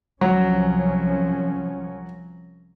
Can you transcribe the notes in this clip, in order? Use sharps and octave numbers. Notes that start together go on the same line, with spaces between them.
C2 F3 F#3 C#4